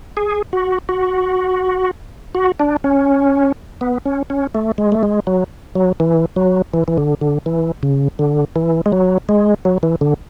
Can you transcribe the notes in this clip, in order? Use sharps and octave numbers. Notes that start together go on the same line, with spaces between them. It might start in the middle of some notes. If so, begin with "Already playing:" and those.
G#4
F#4
F#4
F#4
D4
C#4
B3
C#4
C#4
A3
G#3
A3
G#3
F#3
F#3
E3
F#3
E3
E3
D3
D3
E3
C#3
D3
E3
G#3
F#3
G#3
F#3
E3
D3